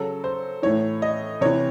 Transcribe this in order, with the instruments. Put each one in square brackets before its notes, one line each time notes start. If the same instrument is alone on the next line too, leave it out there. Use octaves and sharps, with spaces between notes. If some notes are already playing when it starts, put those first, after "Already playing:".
Already playing: [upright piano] C#3 F#3 A4
C5
A2 E3 C#5
D#5
C3 E3 C#5